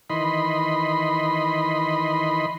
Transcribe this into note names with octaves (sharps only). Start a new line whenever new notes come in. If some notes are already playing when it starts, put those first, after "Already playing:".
D#3 E3 D#5 B5 C6